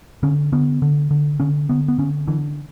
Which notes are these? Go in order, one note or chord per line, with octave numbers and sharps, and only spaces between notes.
D3 C#4
D3 B3
D3
D3
D3 C#4
D3 B3
B3
D3 C#4
D3 E3